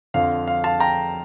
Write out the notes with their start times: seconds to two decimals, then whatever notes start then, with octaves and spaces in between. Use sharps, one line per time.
0.14 F2 D3 F3 F5
0.47 F5
0.64 F5 A5
0.80 G5 A#5